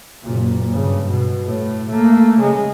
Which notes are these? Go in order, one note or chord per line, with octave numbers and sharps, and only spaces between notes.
F#1 A#2
G2 C#3
B2
A2
A3 A#3
C#3 G#3